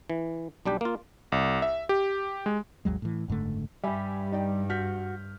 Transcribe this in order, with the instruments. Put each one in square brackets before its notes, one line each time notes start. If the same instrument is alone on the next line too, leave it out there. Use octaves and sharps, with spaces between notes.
[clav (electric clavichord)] E3
B1 G3 D4 G4
A#3 F4
[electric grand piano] C2
E5
G4
G#3
[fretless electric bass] G#1 D#2 F#3 G#3
A2 E3
F#1 G#2 D3 A3
[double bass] G2 [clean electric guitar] G3 G4 [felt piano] E5 G#5 B5
[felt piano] D#4 D5 G5
[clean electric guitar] F#4 [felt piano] F6 G6 B6